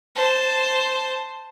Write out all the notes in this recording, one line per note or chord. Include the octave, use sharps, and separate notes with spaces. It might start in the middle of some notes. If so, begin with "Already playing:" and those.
C5 A5